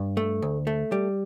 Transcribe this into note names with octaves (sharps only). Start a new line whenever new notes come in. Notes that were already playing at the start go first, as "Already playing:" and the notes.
Already playing: G2
A3
D2
A3
G3